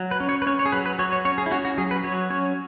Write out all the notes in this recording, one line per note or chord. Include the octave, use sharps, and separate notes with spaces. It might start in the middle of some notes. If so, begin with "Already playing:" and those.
Already playing: F#3
B4
C#4
C#5
B4
C#4 C#5
C#5
G#4
F#3 B4
B4
F#3 C#5
C#5
C#4 C#5
G#4
E4
C#4 F#4
F#4
F#3 G#4
B4
F#3 C#5
C#4 C#5